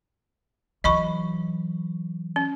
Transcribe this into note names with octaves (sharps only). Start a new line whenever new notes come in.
E3 F#3 D#5 B5 C#6
C#4